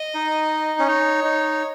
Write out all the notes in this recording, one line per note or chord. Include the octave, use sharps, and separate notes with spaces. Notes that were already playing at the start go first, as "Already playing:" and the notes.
Already playing: D#5
D#4
C#4
D#4 C#5
D#4